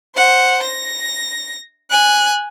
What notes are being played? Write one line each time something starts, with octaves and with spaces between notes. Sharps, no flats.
C5 F#5
A#6
G#5 F#6